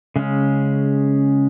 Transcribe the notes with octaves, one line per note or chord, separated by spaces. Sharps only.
C#3 G#3 C#4